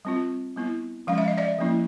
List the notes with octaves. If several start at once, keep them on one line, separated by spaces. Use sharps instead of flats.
G3 C4 F4
G3 B3 E4
F3 G#3 C#4 F5
E5
D#5
D5 E5
F3 A#3 C#4 E4